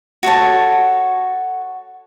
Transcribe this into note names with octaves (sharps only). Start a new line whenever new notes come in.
F#4 A4 C#5 A5